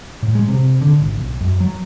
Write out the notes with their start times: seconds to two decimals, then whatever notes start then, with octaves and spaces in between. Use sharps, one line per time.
0.23 A2
0.35 G#3
0.48 C3
0.81 D3
1.00 G#1
1.17 B1
1.41 F#2
1.60 F#3